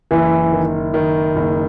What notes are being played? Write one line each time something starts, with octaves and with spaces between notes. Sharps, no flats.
F#1 E3
D#3
D#3
F#1